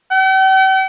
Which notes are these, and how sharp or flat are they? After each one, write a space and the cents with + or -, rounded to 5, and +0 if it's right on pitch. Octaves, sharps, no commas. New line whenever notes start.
G5 -45